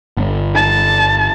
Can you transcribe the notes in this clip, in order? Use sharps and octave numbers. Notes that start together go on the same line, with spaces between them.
G1
A5